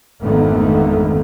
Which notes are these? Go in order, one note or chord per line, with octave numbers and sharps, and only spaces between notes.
G#1 F2 D3 D#3 A3 B3